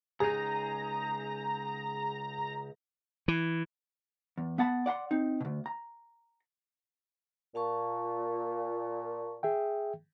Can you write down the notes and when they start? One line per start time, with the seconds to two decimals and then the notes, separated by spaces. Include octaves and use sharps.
0.20 C#2 D#4 G#4 A#5
3.28 E3
4.38 E2
4.58 B3 F#5 A5 B5
4.86 D5 F#5 B5 C6
5.11 C4 D#4
5.41 D2 B2
5.66 A#5
7.55 A#2 F5 A5 C#6
9.43 G#4 E5 G5